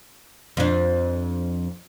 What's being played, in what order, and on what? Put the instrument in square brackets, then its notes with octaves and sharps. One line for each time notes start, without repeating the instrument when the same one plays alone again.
[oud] F2 D4